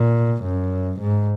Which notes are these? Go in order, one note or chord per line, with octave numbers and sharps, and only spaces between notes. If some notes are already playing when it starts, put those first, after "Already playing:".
Already playing: A#2
F#2
G#2